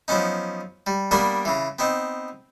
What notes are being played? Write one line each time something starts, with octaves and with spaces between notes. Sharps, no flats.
F3 F#3 B3 C#4 D#4
G3
G3 A#3 B3 D4 A#4
C#3 E3
B3 C4 D#4